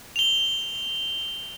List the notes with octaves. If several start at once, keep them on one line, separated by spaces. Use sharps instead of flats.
F7 G7